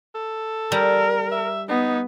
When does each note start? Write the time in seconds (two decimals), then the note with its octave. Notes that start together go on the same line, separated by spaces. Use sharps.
0.15 A4
0.72 G3 A#4
1.32 E5
1.69 B3 D#4